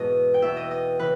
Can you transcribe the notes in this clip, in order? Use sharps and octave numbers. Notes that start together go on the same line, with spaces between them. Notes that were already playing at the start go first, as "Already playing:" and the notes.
Already playing: E2 G#2 B2 D#5
G5
E2 B2 E5
D#5
D#5
C#3 E3 B4